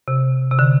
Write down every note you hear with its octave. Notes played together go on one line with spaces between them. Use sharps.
C3
C3
D3